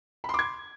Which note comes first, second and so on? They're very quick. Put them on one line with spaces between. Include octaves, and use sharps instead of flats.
B5 C6 D6 G#6